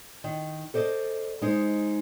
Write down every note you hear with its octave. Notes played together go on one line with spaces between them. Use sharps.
D#3
A4 C5 D5 D#5
G#3 D#4 C5